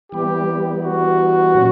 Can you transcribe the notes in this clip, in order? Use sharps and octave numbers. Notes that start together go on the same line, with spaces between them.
E3 G3 B3 G4
F#4
A#2 F#3 C#4